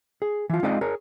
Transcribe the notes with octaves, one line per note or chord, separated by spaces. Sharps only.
G#4
E3 F4
G#3 C4 D#4 F4 D5 D#5
G#4 A#4 C#5